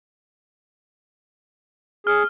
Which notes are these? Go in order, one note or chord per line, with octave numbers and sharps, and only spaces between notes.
G#4 F6